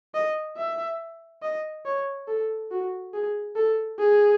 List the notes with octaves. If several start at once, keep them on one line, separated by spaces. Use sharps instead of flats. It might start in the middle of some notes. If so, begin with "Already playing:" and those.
D#5
E5
D#5
C#5
A4
F#4
G#4
A4
G#4